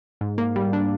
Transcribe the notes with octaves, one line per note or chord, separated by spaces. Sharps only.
G#2
A#3
G3
D4